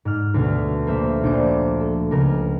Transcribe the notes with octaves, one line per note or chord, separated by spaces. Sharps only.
G#2 F6
D2 B2 A3 F6
A#1 A#3 C5 E5
A#1 D4 C5 D7
A4
C#2 A#4